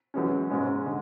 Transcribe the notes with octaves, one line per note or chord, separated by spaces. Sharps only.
F#2 E3 G#3 C#4
G#2 G#3 C#4
D3 G#3